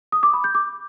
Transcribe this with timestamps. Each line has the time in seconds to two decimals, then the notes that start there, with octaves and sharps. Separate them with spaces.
0.12 D#6
0.23 D6
0.34 B5
0.44 G6
0.55 D6